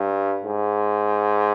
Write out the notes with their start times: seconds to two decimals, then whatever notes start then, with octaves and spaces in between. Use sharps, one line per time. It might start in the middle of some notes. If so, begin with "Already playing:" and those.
Already playing: G2
0.44 G#2